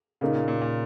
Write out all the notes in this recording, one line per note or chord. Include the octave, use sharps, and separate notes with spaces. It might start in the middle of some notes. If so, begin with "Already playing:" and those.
A#2 C#3 A#3 D#4
A#2
A#2
A#2